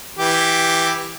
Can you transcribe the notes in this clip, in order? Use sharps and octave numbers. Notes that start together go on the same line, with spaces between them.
E3 G4